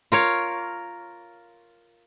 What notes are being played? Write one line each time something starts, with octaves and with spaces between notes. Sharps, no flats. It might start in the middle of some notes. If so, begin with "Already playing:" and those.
F4 A#4 C#5